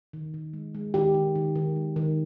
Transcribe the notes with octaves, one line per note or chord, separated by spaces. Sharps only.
D#3
D#3
G#3
G#3
D#3 G4
D#3
D#3
D#3
G#3
D#3